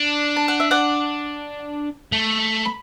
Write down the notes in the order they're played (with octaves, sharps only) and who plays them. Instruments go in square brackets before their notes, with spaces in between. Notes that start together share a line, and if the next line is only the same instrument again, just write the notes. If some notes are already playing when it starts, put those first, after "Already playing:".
Already playing: [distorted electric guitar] D4
[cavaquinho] A5
F#5
E5
D5 F#5
[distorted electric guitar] A3
[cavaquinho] B5